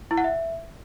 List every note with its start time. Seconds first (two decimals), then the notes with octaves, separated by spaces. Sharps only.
0.11 E4
0.18 F#5
0.24 E5